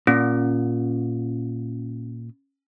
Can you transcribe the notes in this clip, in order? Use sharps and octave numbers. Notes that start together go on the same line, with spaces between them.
A#2 C#4